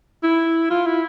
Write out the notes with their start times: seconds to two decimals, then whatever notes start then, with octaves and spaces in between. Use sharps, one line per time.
0.23 E4
0.70 F4
0.86 E4